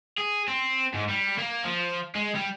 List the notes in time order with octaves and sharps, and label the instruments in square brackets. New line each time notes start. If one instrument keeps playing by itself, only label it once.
[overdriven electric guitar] G#4
C4
G#2
G3
A#3
F3
G#3
G3